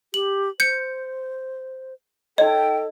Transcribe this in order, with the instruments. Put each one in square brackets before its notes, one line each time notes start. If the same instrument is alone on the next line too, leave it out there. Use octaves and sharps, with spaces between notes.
[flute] G4 [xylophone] F#7
[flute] C5 [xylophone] G6 C#7
[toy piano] D#4 D#5 [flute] A4 [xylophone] C#5 [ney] G5